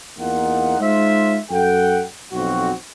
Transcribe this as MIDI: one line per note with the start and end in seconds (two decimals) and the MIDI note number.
0.19 0.76 40
0.19 0.76 58
0.19 0.76 63
0.19 0.76 65
0.19 0.76 78
0.80 1.38 56
0.80 1.38 63
0.80 1.38 65
0.80 1.38 72
0.80 1.38 76
1.51 2.04 42
1.51 2.04 69
1.51 2.04 78
1.51 2.04 79
2.33 2.71 35
2.33 2.71 41
2.33 2.71 60
2.33 2.71 66